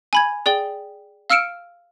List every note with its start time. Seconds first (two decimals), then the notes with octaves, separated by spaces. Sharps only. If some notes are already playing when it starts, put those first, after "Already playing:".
0.13 G#5 B5 G#6
0.46 G#4 D5 G5 G7
1.30 F5 E6 F6 C#7 D7 E7